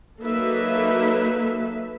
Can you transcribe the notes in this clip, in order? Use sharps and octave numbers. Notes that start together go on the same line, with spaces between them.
F#3 A#3 D#4 A4 B4 E5